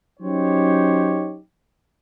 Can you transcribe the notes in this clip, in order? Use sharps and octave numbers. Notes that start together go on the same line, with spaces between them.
F#3 C#4 D#4 G4 C5 C#5